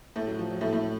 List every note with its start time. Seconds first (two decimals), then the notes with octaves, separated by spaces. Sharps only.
0.16 A2 A3
0.27 F#3
0.39 F3
0.50 F#3
0.61 A2 A3
0.73 A2 A3